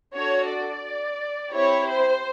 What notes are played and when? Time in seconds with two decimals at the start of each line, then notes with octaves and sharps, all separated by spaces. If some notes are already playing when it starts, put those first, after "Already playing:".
0.15 D4 F#4 A4 C#5
0.49 D5
1.52 C4 E4 G4 C#5
1.87 C5